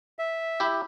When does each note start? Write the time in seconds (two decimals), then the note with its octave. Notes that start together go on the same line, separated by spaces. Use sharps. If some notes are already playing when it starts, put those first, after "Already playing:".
0.19 E5
0.60 E4 G4